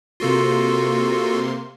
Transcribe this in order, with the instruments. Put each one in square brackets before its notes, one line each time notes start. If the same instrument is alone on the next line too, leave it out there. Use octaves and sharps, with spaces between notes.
[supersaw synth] C3 A#3 C6 [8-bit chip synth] F4 F#4 A4